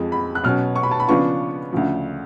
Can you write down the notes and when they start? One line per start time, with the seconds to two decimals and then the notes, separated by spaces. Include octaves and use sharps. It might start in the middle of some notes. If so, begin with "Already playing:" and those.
Already playing: F2 F3 G#3
0.12 B5
0.35 F#6
0.44 B2 F#3 C#4 F6
0.76 C#6
0.83 B5
0.91 A5
1.00 B5
1.08 C#3 F3 B3 D4 F4 C#6
1.72 D2 C#3 F3